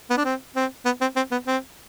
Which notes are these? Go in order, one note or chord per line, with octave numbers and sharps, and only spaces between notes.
B3
D4
C4
C4
B3
C4
C4
B3
C4